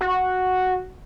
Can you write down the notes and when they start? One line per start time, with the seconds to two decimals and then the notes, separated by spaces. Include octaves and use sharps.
0.01 F#4